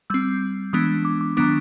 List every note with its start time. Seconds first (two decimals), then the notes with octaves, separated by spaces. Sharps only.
0.10 G3 C4 E6
0.73 E3 G#3 B3 D4 D#6
1.05 D6
1.21 D6
1.37 D#3 F#3 B3 D4 D6